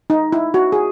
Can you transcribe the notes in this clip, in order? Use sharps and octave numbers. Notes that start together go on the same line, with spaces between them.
D#4
E4
F#4
G#4